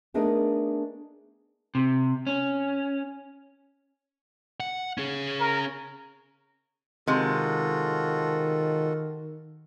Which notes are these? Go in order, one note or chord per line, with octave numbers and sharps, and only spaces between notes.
A3 B3 D4 D#4 G#4 A#4
C3
C#4
F#5
C#4 G#4
A#4
C3 D#3 G#3 F4 F#4 A4